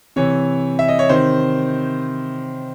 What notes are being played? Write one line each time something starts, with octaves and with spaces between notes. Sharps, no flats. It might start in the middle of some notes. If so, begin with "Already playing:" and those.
C3 E3 C#5
E5
D#5
C#5
C3 D#3 C5